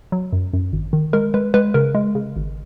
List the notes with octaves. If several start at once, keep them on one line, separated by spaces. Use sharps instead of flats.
F#3
F#2
F#2
G#1
D#3
G#3 A#4
G#3 B4
G#3 B4
C#3 A#4
G#3
C#3
G#1